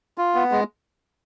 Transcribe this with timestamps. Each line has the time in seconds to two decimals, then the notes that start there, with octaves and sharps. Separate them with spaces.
0.18 F4
0.35 B3
0.51 G#3